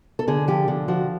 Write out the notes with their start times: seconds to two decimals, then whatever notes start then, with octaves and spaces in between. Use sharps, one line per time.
0.19 A4
0.28 D3 G#4
0.48 F3 G4
0.68 D3
0.88 F3 F#4